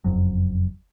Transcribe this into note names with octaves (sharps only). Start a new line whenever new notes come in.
F#1 F2 F#3